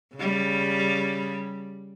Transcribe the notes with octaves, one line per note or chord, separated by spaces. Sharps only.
C#3 G3